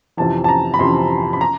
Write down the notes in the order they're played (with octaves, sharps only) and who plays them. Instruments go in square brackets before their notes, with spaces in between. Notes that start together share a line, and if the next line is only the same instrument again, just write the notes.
[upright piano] F2 C3 E3 A5
A5
A#5
B5
F2 C3 E3 C6
B5
A#5